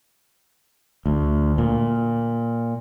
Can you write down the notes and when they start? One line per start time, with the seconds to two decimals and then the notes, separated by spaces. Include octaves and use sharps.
1.06 D2
1.58 A#2